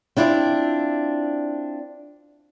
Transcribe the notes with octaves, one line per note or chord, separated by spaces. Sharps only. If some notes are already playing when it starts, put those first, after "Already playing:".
C4 D4 E4 F4 D5